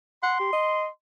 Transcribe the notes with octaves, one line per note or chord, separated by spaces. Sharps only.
F#5 C6
G4
D#5